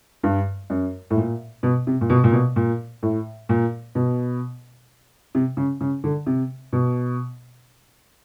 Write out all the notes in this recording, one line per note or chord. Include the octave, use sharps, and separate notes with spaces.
G2
F#2
A2
A#2
B2
C3
A#2
B2
A#2
B2
A#2
A2
A#2
B2
C3
C#3
C#3
D3
C3
B2